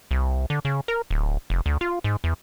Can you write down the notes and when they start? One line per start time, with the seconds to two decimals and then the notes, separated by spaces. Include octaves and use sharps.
0.11 C2
0.50 D3
0.65 C#3
0.88 A#4
1.11 D1
1.50 F1
1.66 D2
1.81 F4
2.04 G#2
2.24 E2